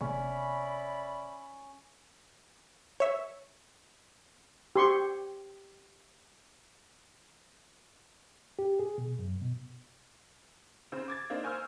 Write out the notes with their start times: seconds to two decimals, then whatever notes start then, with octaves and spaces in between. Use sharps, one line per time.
0.01 F#1 A2 C3 B3 C#4 D5 E5 B5
3.00 C#5 E5
4.76 G4 C6 C#6
8.59 G4
8.79 G#4
8.98 B2
9.19 F#2
9.42 B2
10.92 C#3 C4
11.08 D6 G#6 A6
11.30 A#3 C4 D4 D#4
11.43 A#4 C5 G#5 C#6 E6 F6